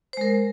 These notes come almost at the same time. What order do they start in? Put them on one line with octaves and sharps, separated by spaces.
C5 G#3 A#4